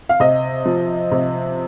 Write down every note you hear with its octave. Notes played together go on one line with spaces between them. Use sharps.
F5
C3 D#5
F3
C3